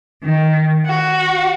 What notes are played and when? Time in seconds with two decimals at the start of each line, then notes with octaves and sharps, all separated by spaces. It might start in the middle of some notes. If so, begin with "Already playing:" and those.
0.23 D#3
0.85 F#4